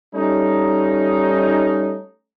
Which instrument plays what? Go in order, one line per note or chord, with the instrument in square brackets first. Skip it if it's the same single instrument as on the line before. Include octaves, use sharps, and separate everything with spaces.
[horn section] G3 A3 C#4 D#4